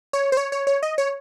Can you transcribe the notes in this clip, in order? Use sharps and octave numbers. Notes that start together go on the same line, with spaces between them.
C#5
C5
C#5
C#5
C#5
D#5
C#5